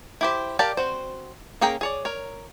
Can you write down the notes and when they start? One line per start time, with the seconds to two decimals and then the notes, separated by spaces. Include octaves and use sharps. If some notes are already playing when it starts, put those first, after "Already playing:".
0.21 E4 G4 C5
0.59 G4 A#4 D5 F5 A5
0.77 C4 F#4 C5
1.61 A#3 C#4 G#4 G5 A#5
1.81 G#4 C#5 D5
2.05 A#4 C#5